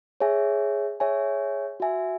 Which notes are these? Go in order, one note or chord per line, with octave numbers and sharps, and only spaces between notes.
G#4 C#5 E5 G#5
G#4 C#5 E5 G#5
F#4 E5 G#5